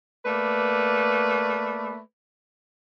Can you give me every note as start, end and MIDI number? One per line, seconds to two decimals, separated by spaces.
0.26 1.98 57
0.26 1.98 58
0.26 1.98 71
0.26 1.98 74